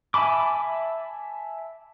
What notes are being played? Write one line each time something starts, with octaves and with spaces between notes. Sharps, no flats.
E5 G#5 A5 B5 D6